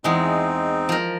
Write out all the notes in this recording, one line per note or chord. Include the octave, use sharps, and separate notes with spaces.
E2 G#3 C4 D#4
F3 A#4